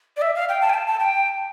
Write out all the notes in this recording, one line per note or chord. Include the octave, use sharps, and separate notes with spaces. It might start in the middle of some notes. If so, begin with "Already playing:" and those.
D5
E5
F5
G5
A5
G5
A5
A5
G5